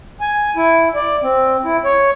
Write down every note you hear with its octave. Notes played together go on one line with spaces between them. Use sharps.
G#5
E4
D5
C4
E4
C#5